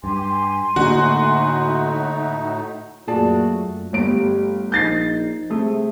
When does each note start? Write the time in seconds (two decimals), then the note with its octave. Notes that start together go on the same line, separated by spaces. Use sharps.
0.04 G2 G4 G#5 C6
0.76 A2 D3 A3 A#3 D#4 F#4
3.08 F#2 A#2 A3 F#4 G#4 D5 A5
3.93 G1 A3 G4 D7
4.72 A#1 D#4 G6 A6 C7
5.50 C3 A3 G#4